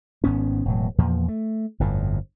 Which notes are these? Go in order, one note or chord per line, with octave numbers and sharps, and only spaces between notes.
G#1 G#2 B3 C#4
E1 A2 F#3
E2 A#2 F3
A3
G1 F2 A2